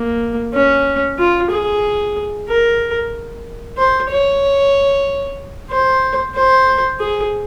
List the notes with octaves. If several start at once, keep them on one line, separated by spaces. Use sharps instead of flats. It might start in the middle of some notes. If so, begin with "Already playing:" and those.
Already playing: A#3
C#4
F4
G#4
A#4
C5
C#5
C5
C5
G#4